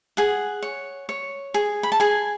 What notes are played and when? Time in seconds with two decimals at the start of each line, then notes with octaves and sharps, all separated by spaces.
0.17 G#4 F#5
0.62 C#5
1.09 C#5
1.54 G#4
1.83 B5
1.92 A5
2.00 G#4 G#5